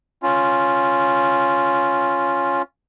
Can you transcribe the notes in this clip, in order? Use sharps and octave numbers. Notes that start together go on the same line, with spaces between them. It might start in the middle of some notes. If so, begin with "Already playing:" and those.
C#4 F4